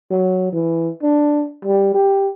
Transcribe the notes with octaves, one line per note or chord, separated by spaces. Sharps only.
F#3
E3
D4
G3
G4